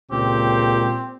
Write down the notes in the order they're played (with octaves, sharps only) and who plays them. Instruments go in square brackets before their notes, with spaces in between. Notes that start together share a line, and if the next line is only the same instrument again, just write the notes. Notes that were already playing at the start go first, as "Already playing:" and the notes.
[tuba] C#2 [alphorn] A#2 [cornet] C4 [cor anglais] G4